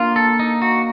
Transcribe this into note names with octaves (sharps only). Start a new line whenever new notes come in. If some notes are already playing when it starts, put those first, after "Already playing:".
Already playing: A#3 D4 F4
A4
D#4
F#4